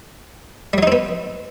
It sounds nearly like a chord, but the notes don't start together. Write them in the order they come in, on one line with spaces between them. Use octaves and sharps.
G3 F#3 D#4 C4 B3